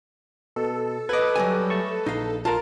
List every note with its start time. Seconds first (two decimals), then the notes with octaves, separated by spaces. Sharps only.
0.56 B2 A4
1.09 B4 D#5 D6 F#6 G#6
1.36 F#3 G3 G#5
1.70 A3 A5 C#6
2.06 A#1 D#4 F5
2.45 F4 A#4 A5